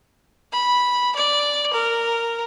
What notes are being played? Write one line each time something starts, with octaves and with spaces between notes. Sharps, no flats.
B5
D5
A#4